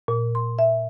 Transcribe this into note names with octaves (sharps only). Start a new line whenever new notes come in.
A#2
C6
E5